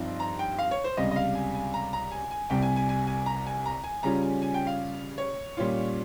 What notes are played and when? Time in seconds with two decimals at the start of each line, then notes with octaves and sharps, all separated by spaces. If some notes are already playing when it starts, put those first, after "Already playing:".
Already playing: G2 F3 C4 D#4
0.20 A#5
0.39 G5
0.59 F5
0.71 C#5
0.84 C5
0.97 C#2 C3 G3 D#5
1.11 D#5
1.16 F5
1.35 G#5
1.55 G#5
1.74 A#5
1.93 A#5
2.11 G#5
2.31 G#5
2.50 C2 C3 G3 G5
2.62 G#5
2.76 G#5
2.89 G#5
3.07 G#5
3.26 A#5
3.47 G#5
3.66 A#5
3.84 G#5
4.03 C#3 G3 C#4 F4 A#5
4.22 G#5
4.42 G#5
4.54 G5
4.67 F5
5.18 C#5
5.57 A#2 G3 C#4 F4